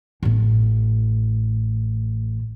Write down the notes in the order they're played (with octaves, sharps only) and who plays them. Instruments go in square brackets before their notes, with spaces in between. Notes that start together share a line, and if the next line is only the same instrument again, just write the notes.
[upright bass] A1 A2